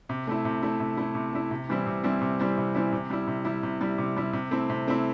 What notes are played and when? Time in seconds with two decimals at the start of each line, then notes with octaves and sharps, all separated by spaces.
0.09 C3
0.27 A3 E4
0.45 C3
0.62 A3 E4
0.80 C3
0.97 A3 E4
1.15 C3
1.33 A3 E4
1.51 C3
1.69 E3 G3 C4 E4
1.86 C3
2.04 E3 G3 C4 E4
2.21 C3
2.39 E3 G3 C4 E4
2.57 C3
2.75 E3 G3 C4 E4
2.92 C3
3.10 G3 E4
3.27 C3
3.45 G3 E4
3.63 C3
3.81 G3 E4
3.98 C3
4.16 G3 E4
4.33 C3
4.51 A3 C4 E4
4.70 C3
4.87 A3 C4 E4